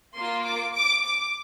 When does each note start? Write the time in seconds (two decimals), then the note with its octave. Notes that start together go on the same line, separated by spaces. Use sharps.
0.15 A#3 F4 C6
0.44 D6
0.74 D6
1.04 D6